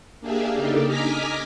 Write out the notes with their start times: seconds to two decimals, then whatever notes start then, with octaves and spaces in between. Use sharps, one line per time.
0.21 A#3 D4 G4 G#4 E5 F5
0.53 C#3 A#3 D4 D#4 G4 A4
0.86 D#5 G#5 A#5 D6 F6 B6